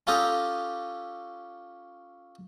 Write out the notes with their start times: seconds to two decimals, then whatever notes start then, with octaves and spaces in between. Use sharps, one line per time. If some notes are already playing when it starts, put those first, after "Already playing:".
0.07 C#4 F4 G4 A4 A#5 D#6